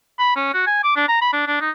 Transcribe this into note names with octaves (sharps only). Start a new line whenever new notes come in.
B5
C#4
F#4
G#5
D6
D4
A#5
B5
D4
D4
D#4